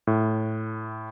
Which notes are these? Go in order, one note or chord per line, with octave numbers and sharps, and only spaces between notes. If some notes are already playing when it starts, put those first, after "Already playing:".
A2